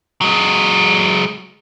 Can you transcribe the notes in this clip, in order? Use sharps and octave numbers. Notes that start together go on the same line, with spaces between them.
F#3 G#3